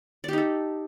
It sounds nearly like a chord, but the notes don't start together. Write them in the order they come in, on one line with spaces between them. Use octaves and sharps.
D5 G4 D#4 A4